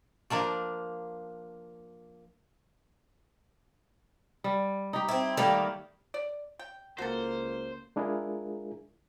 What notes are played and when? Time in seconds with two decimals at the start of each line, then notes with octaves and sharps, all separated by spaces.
0.30 F3 A#3 D4 D5
4.44 G3
4.93 D#4 G4
5.09 C4 E4
5.37 D#3 G3 A3 A#3 G4
6.14 D5
6.59 G5
6.98 C#2 A#3 F#4 A4 C5
7.96 G#3 D4 E4 F4 G#4 A#4